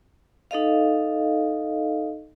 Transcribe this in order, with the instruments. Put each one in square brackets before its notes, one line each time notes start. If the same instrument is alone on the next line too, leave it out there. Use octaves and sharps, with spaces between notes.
[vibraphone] D#4 A4 D#5 F5